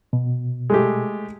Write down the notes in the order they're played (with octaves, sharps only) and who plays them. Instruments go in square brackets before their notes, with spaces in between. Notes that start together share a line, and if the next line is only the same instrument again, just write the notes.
[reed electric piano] B2
[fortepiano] G#3 A3 G4